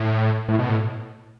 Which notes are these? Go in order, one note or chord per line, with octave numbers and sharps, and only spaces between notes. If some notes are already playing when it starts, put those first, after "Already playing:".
Already playing: A2
A2
B2
A2